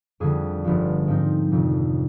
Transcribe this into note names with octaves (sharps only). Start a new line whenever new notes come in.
F2 D3 G3 G#4
G1 G2 F3 B3 F4
G#2 F3 C4 D#4
F1 F2 C3 D#3